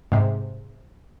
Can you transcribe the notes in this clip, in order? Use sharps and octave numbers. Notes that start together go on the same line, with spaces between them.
G#2 C3